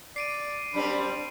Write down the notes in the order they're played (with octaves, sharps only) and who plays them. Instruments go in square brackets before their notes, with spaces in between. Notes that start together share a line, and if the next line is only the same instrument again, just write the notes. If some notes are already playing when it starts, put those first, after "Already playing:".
[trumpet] D5 [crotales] C7 D7 D#7
[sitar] F#2 G3 C4 [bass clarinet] D4 [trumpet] B5